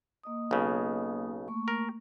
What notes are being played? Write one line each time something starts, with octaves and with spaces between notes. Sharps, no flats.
A#3 D#5 D#6
B1 C#3
A3 A#3 C#6
A#4